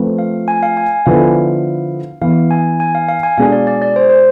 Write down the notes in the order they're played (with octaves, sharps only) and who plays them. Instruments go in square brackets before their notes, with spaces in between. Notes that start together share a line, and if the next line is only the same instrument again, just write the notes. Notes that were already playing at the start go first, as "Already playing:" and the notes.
Already playing: [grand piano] F3 A3 C4 F4 B4
[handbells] F5
G#5
F5
G#5
G#5
[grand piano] D3 F3 B3 E4 B4 [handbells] F5
[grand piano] E3 B3 E4 [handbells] F5
[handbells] G#5
G#5
F5
F5
G#5
[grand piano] B2 G#3 D4 G#4 [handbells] F5
[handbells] D5
D5
D5
C5
C5